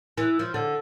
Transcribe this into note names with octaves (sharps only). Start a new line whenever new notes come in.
E3
F3
D3